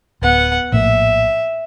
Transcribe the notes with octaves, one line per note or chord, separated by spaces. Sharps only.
D1 B3 F#5
A#1 A2 A#3 E5